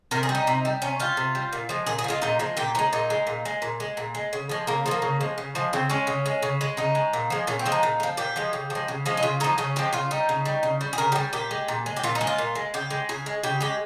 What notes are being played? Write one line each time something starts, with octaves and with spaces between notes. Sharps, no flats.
C3 A#4
G#4
G3
D#4
C3
G3
C3 C#4
G3 F4
C3
G3
A#2
F3 G#3
A#2 G#4
G#4
F3
G#3 F4
A#2 D#4
F3 G#3
A#2 G4
F3 G#3 D#4
A#2 D#4
G#3
A#2
G#3
A#2
G#3
A#2
G#3
C#3
F3 G#3
C#3 A#3
F3 G#3
A#3
C#3
F3 G#3
C#3
F3 G#3
C#3 C4
G#3 C#4
C#3
G#3
C#3
G#3
C#3 D#4
G#3
A#2
F3 G#3
A#2 C#4
C4
F3 G#3
D#4
A#2
G#3
F3
A#2 G4
F3 G#3
C#3
F3
G#3
C#3
F3 G#3
D#4
C#3 F4
F3 G#3 D#4
C#3 C#4
F3 G#3 G4
C#3 F4
G3 D#4
C#3
G3
C#3
G3
G#4
C#3 A#4
G4
G3 G#4
A#2 G4
G#3
A#2
G#3
G4
A#2 F4
D#4
G#3
F4
A#2
G#3
C#3 G4
G#3
C#3 G#4
G#3
C#3 G4
G#3 G4